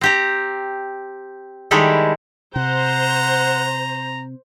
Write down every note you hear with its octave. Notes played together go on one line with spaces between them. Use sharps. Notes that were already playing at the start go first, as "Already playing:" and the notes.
C4 G4 A#5
D#3 G3 G#3 E4 G4 A4
C3 C5 F#5 A#5